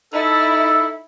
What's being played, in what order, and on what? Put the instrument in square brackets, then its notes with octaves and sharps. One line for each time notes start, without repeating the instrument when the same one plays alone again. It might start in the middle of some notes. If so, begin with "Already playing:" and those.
[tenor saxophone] D#4 [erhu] E4 [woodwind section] A4